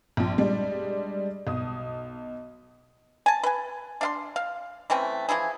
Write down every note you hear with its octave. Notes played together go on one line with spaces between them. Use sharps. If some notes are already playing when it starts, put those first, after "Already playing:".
A#1 F3
G3 G#3 D4
B1 D#6
G#5 A5
B4 G#5
D4 F5 C6
F5
E3 A3 C4 C#4
E3 F3 E4 G#4